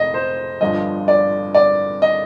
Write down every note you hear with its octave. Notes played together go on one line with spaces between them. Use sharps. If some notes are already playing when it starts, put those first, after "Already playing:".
Already playing: F1 D#5
C5
G1 G2 F3 D#5
D5
D5
D#5